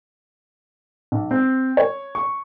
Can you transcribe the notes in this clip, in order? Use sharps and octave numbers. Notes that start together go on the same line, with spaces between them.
B1
C4
C#5
C#6